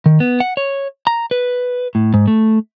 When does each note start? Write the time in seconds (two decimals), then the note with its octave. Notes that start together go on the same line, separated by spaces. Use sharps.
0.06 D#3
0.20 B3
0.40 F#5
0.57 C#5
1.07 A#5
1.31 B4
1.95 A2
2.14 G#2
2.27 A3